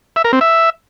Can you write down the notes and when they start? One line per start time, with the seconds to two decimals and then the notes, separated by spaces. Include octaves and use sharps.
0.16 E5
0.24 A#4
0.33 C4
0.41 E5